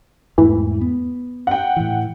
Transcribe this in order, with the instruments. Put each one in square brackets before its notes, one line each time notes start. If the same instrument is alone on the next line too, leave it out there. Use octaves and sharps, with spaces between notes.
[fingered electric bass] E2 G#2 A3 [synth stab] E3
[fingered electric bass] B3
[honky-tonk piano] F#5 G5
[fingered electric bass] A2 E3